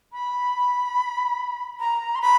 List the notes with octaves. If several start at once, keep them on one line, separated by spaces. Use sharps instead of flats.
B5
A#5
C6
B5